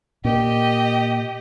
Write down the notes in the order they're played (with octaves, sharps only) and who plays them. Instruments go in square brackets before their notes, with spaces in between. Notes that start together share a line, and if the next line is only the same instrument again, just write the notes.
[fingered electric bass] A#2 [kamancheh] G4 D#5